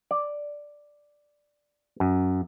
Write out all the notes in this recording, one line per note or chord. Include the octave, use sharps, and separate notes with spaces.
D5
F#2